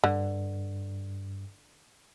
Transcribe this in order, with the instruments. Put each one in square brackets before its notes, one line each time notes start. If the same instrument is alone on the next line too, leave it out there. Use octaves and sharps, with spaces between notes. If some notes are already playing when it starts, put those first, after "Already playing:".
[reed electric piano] G2 [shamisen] D3